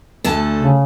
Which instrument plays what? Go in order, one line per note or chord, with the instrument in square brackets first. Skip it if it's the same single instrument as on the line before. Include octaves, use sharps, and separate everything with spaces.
[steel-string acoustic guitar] D2 D3 A5 [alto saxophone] A3
[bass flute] C#3